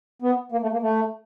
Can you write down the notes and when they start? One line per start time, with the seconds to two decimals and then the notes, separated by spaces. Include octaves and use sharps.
0.22 B3
0.52 A#3
0.62 A3
0.72 A#3
0.82 A3